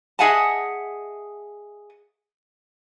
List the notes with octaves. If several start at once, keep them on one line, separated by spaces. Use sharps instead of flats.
G#4 D#5 E5 F#5 G#5 A5